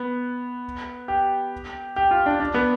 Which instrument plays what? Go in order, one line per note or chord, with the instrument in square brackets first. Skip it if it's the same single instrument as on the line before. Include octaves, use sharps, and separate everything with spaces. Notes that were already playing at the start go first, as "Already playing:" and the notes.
Already playing: [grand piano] B3
G4
G4
F4
D4
D4
B3